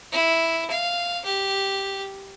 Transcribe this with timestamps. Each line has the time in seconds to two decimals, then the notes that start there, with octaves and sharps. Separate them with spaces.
0.12 E4
0.71 F5
1.25 G4